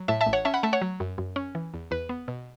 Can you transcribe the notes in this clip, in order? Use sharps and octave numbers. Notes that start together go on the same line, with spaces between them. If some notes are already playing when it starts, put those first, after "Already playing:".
Already playing: F#3
A2 E5 A5
E5 A5
A1
C#5 F#5
C#4 E5 A5
F#5 B5
A3 E5 A5
C#5 F#5
F#3
F#2
F#2
C#4
E3
E2
E2 B4
B3
B2